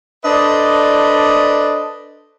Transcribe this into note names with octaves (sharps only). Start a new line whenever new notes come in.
D4 A4 B4 C5 D5 D#5